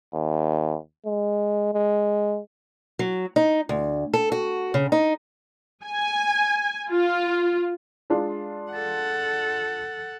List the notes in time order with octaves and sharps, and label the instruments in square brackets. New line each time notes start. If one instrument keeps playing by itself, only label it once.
[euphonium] D#2
G#3
G#3
[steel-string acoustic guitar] F#3
D#4
D2
A4
F#4
C#3
D#4
[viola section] G#5
F4
[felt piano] G#3 D4 F4
[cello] A4 F#5